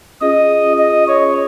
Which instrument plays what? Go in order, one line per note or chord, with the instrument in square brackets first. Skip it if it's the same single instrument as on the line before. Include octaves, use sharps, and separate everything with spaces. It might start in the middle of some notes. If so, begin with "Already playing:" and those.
[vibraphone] C#4 F4 G#4 [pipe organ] D#5
[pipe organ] D#5
C#5